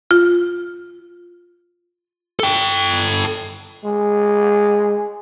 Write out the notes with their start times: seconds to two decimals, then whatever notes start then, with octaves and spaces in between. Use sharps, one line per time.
0.11 F4
2.40 A4 G5
3.84 G#3